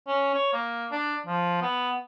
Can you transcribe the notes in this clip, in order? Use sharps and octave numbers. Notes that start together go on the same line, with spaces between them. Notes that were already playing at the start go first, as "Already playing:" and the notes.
C#4
C#5
A#3
D4
F3
B3